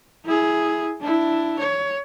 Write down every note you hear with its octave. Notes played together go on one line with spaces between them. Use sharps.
E4 G#4
D4 E4
C#5